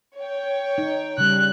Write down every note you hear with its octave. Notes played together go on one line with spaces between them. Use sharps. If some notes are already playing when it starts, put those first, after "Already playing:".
C#5 G5
D#4
C#3 G3 F#6